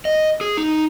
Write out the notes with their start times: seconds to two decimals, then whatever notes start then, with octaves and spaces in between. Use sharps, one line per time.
0.05 D#5
0.41 G#4
0.57 D#4